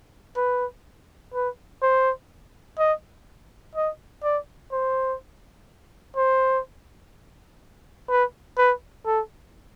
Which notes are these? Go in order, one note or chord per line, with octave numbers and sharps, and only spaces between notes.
B4
B4
C5
D#5
D#5
D5
C5
C5
B4
B4
A4